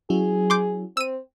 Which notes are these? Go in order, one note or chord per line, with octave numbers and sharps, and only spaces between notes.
F#3 C#4 E4 G#4
C6 D6 G6
C4 E6 D#7